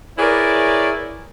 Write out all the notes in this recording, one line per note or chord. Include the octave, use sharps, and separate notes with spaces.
E4 G#4 A#4 B4 C#5 D5